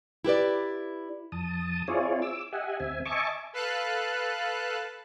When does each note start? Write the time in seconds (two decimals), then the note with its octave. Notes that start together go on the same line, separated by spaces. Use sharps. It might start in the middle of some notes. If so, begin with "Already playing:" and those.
0.24 E4 G4 B4 D5
1.32 F2 A5 D#6
1.88 C4 E4 F4 G#4 C#5 D5
2.22 D6 E6
2.52 G4 D#5 E5 F#5 G#5
2.80 D2 C4 E5 G#5
3.05 D#5 E5 G#5 A5 C#6 D6
3.53 A4 B4 F5 A5 F#6